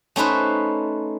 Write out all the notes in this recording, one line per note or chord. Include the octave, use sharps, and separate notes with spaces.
A3 C#4 D#4 B4 C5